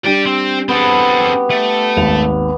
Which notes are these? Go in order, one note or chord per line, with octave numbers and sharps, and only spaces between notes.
G3 D4 D5 G5
C4
B3 C4 A4
G4
A3
G#1 D#2 F7